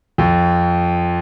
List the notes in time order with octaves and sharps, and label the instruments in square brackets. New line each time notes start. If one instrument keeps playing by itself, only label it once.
[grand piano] F2